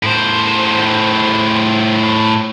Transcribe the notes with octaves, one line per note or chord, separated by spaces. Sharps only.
A2 C5